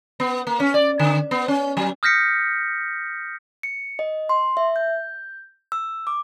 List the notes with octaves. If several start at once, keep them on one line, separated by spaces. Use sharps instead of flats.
B3
A#3
C#4
D5
D3
B3
C#4
F#3
D#6 F6 G6 A#6 B6 C#7
C#7
D#5
C6
E5
G6
E6
D6